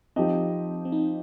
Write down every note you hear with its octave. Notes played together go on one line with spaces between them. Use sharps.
F3 C4 D#4 G4 D#5
C4
D#4